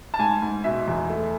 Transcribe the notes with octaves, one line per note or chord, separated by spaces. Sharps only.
A5
G#2 G#5
G#2
B2 E5
E2
A3